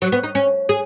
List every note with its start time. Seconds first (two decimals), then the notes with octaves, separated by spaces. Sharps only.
0.02 F#3
0.12 B3
0.24 D#4
0.35 C#4
0.69 G#4